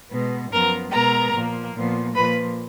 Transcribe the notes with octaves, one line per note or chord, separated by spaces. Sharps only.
B2 G#3 B3
F#2 F3 B3 A#4 A#5
B2 G#3 B3 A#4 A#5
A#2 F3 A#3
A#2 F3 B3
A#2 F3 A#3 B4 B5